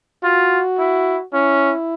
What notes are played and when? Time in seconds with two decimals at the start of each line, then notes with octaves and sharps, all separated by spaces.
0.23 F4 F#4
0.79 E4
1.34 C#4 E4